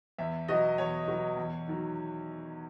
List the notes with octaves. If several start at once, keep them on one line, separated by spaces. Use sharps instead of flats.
E2 E5
B2 F#3 D#5
E2 C#5
B2 F#3
E2
D#3 F#3